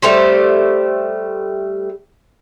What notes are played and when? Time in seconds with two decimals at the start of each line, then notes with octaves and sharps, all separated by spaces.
0.02 G3 A3 G4 C5